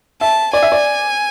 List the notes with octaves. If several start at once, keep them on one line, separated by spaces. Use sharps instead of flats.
E5 A5
D5 G#5
E5
D5